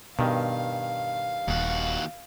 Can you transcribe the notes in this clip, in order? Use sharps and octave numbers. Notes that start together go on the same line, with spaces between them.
G2 B2 D#3 F5
D#1 D#2 F#4